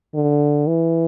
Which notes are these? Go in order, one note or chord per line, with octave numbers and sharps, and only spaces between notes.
D3
E3